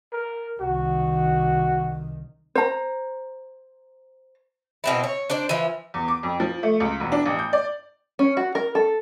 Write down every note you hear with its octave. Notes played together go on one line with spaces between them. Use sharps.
A#4
C2 D#3 F#4
C5 A#5
B2 C4 E4
C#5
D4 C5 D5
E3 F3
E2
D6
F2
F3
A3
C#2
E1
D4
A1
G6
D5
C#4
F#4
A#4
A4